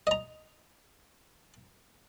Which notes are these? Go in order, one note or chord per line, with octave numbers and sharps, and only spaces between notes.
D#5 A#5